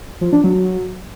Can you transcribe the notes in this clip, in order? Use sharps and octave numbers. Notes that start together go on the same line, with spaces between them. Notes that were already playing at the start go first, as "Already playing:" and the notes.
F3
D4
F#3